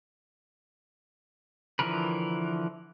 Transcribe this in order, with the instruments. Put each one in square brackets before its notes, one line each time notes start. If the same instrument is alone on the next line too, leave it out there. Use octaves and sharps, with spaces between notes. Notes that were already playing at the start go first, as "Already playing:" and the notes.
[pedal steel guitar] D3 E3 F3 A#4 B4